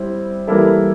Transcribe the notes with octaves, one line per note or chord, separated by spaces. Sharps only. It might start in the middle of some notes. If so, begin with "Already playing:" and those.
Already playing: G3 C4 E4
E3 G3 A#3 E4 A4